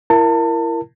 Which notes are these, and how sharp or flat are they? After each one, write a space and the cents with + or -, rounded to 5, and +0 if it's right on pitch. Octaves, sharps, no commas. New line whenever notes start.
E4 +25 A#4 +0 A5 +30